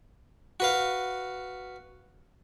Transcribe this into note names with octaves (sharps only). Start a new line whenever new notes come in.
F#4 B4 F5